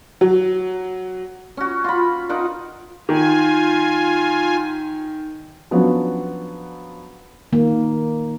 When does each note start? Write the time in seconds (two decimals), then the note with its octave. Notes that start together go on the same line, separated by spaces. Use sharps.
0.21 F#3
1.57 C#4 F#4
1.84 F4 B5
2.29 D#4 F4 A#4 F#5
3.09 D#3 F4 G#5
5.71 F3 F#3 B3 C#4 D4 F#4
7.53 D#3 A#3